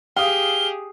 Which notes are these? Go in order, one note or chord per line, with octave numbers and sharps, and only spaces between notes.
G4 G#4 F5 D#6 G7